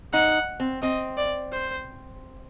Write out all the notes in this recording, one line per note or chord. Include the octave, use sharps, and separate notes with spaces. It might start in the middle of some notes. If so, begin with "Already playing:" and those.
D#4 F#5
C4
C4 D#5
D5
C5